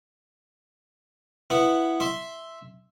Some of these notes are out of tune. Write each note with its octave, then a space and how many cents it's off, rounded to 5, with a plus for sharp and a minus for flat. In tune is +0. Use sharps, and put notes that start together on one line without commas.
B3 +0 E4 +10
E5 +0 C6 +0